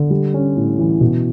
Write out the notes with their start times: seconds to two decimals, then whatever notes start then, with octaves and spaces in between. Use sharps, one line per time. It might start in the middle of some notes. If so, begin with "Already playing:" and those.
Already playing: D3
0.10 G3
0.34 C#4
0.56 A2
0.79 E3
1.01 B2